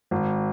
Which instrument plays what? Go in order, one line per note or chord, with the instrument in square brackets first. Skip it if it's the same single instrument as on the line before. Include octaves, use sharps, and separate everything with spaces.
[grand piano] G#1